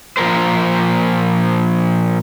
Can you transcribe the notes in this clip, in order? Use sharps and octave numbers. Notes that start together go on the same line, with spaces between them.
A#2 F3 A#4 C5